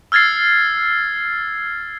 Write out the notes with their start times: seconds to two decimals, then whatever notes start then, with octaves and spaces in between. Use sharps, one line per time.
0.12 E6 F6 G#6 A6 C7